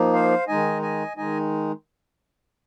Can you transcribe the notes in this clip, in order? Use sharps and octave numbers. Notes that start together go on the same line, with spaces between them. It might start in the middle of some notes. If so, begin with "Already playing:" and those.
Already playing: F3 A#3 D#4
C5 F5
D#3 G#3 D#4 D#5 G#5
D#5 G#5
D#3 G#3 D#4 D#5 G#5